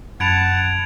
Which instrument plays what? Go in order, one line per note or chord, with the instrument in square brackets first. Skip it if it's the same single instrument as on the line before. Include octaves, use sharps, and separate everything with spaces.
[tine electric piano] F#2 B5 A6 [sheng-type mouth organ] F#5 A5 [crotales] G#6 D7 F7